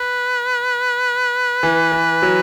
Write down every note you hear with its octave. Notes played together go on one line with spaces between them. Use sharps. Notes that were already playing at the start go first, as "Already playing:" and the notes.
Already playing: B4
E3
E3
F#3